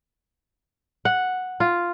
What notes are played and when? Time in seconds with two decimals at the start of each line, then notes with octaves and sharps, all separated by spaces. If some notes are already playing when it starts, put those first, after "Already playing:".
1.05 F#5
1.60 F4